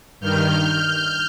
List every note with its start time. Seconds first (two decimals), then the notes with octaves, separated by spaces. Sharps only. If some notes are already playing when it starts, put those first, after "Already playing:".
0.20 G2 D#3 F6 G6